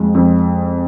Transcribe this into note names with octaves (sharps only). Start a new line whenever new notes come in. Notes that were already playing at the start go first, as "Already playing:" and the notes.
Already playing: F2 G#3
F2